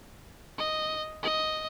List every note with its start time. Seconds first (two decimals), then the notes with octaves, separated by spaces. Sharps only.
0.58 D#5
1.23 D#5